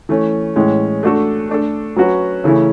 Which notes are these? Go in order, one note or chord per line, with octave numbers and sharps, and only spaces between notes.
E3 A3 C#4
A2 E3 G#3 C#4
A3 D4 F#4 A4
A3 D4 A4
F#3 C#4 F#4 B4
C#3 E3 A3 C#4 E4